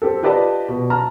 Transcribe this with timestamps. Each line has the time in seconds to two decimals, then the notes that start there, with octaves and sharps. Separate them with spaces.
0.02 C4 G4 A4
0.23 F4 G4 B4 D5 D#5 A5
0.68 B2
0.90 A5 A#5 F6